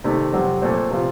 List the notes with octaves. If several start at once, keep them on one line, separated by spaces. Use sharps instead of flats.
C3 D#3 A3
F2 C3 F#3 C4
A#2 A3 C4
C3 F3 C4 F4